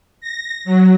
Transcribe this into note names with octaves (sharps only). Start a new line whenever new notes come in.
A#6
F#3